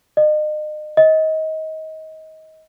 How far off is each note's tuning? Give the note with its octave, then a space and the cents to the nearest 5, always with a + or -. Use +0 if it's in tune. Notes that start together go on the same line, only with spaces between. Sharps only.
D#5 -40
D#5 +25